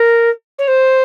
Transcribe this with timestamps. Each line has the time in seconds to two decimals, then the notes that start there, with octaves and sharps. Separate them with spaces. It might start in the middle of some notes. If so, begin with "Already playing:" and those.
Already playing: A#4
0.58 C#5
0.68 C5